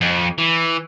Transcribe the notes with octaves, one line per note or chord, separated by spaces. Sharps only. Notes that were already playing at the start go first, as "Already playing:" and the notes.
F2
E3